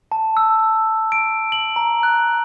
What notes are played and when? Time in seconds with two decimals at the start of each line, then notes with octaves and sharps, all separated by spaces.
0.12 A5
0.37 E6
1.12 D7
1.52 F#7
1.76 A#5
2.03 F#6